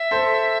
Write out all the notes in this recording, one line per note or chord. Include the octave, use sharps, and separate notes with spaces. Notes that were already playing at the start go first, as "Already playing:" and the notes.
Already playing: E5
A4 C5